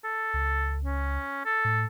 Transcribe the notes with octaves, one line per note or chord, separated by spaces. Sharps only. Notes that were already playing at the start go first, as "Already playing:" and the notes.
A4
C#2
C#4
A4
A2